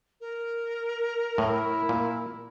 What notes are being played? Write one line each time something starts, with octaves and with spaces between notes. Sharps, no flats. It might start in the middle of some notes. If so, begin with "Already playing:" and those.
A#4
A2 E4
A#2